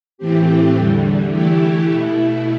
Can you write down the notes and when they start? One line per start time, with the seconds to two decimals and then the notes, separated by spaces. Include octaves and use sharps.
0.18 A2 E3 A3 C4 G4
0.75 E2 D3 G3
1.31 E3 A3 E4 G4
1.88 B2 A3 E4